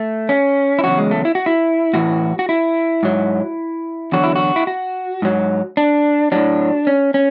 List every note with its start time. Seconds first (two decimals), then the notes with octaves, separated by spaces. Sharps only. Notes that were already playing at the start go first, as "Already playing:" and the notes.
Already playing: A3
0.29 C#4
0.79 E4
0.84 E2 C#3 F#3 F#4
0.98 G#3
1.11 A3
1.25 E4
1.35 F#4
1.46 E4
1.93 A2 E3 F#4
2.39 F#4
2.49 E4
3.03 G#2 F#3
4.12 E2 D3 F#3 F#4
4.24 E4
4.36 F#4
4.56 E4
4.67 F#4
5.22 G#2 F#3
5.77 D4
6.32 A2 F#3 D4
6.87 C#4
7.14 C#4